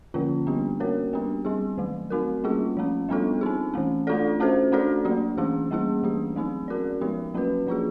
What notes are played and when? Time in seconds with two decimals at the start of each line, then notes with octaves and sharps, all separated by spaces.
0.14 D3 F3 A#3 C#4 F4
0.47 G3 B3 D4 G4
0.80 A#3 C#4 F#4 A#4 C#5
1.13 G3 B3 D4 G4
1.45 G3 C4 E4 G#4
1.78 D#3 F#3 A3
2.10 A3 C4 D#4 F#4 A#4
2.44 G3 A#3 C#4 F4 G#4
2.77 F3 A3 C#4
3.09 G3 B3 D4 F4 A4
3.41 C4 D#4 G#4
3.74 E3 A3 C#4
4.07 A3 D4 F4 A4 D5
4.40 A3 C#4 F#4 A4 C5
4.72 A3 D4 F#4 A4 D5
5.05 F#3 A#3 D4 G4
5.37 E3 A3 C#4 E4 G#4
5.71 G3 A#3 C#4 E4 G#4
6.03 E3 A3 D4 G4
6.36 F#3 A3 C4 D#4 G#4
6.68 C#4 F#4 A#4 D5
7.01 F3 G#3 B3 D#4 G4
7.34 F#3 A#3 C#4 F#4 B4
7.67 F3 A#3 D4 F4 G#4